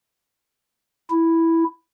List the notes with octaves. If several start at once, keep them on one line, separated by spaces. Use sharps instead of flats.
E4